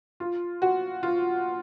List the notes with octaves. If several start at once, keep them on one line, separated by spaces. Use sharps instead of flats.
F4
F#4
F4